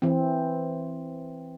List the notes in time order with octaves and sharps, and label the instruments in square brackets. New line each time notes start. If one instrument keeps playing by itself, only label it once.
[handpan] E3 C4